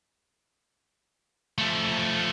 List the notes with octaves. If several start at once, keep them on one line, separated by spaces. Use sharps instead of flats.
F3 A3